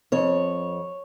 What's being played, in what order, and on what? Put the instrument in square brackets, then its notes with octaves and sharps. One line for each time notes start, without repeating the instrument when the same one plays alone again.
[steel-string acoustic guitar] F2 C#5